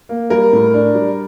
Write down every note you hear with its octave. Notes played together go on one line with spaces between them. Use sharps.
A#3
G3 A#4
A2
D4
G3